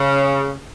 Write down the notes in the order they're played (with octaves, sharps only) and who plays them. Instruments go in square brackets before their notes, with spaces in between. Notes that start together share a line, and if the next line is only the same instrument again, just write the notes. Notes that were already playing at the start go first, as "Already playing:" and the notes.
Already playing: [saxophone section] C#3